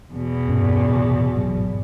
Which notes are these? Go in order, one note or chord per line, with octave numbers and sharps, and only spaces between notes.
E2 B2
G2 A#2 C#4
A2 C3
A1 G#2 F#3